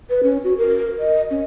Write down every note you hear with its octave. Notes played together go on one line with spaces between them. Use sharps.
B4
C#4
F#4
A#4
D#5
C#4